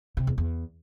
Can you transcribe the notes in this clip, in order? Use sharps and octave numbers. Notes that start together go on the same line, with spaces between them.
C3
E2
E2